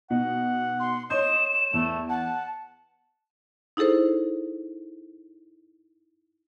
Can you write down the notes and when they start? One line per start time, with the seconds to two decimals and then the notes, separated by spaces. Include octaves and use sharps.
0.10 B2 D#4 F#5
0.80 C6
1.10 C#5 D#5 C6 G6 E7
1.74 E2 A3
2.09 F#5 A5
3.77 D#4 E4 G#4 A4 C5